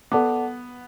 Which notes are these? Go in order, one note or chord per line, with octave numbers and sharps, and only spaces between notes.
B3 A4 D5 F#5 A5 D6